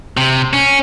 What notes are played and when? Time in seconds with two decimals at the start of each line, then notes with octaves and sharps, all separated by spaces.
0.17 C3
0.53 C#4